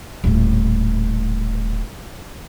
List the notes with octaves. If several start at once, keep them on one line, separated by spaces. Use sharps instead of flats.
D#1 A2